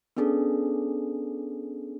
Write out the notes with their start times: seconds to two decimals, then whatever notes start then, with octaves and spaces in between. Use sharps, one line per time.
0.17 B3 C#4 D4 G#4 A4